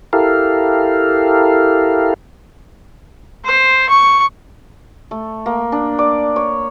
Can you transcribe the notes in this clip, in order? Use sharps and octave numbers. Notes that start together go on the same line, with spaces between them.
E4 G4 A4 A#4 F5
C5
C#6
A3
A#3
D4
D5
C#5